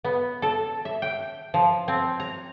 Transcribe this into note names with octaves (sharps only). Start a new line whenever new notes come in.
B3
A4
E5
G5
F3
C4
A#5